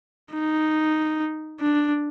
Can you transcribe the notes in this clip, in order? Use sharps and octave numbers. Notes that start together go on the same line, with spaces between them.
D#4
D4